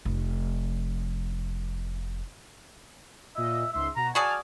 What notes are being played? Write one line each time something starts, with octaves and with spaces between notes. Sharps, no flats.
F1 F3
A#2 D#5 E5
C#2 G#2 E5 C6
B2 F#4 A#5
F#4 G#4 D5 G#5 A5 F6